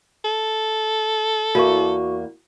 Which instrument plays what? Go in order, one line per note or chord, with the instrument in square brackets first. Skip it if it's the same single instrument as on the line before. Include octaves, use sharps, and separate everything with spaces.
[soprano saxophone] A4
[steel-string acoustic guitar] E2 A#3 [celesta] F#4 C#6